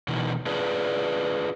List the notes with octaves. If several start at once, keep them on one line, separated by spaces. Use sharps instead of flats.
B2 D#3 E3
D4 F4 G#4 B4